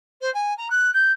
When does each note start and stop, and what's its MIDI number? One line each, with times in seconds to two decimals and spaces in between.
0.21 0.32 72
0.34 0.56 80
0.57 0.70 82
0.70 0.90 90
0.94 1.12 91